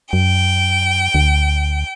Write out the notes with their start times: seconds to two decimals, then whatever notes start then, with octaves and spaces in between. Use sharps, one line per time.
0.13 F#2 G5
1.14 D2